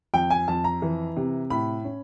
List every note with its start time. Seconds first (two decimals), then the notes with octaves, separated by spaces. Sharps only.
0.14 F2 G5
0.30 G#5
0.48 F2 A5
0.64 A#5
0.82 E3
1.17 C3
1.50 A2 B5
1.85 C#4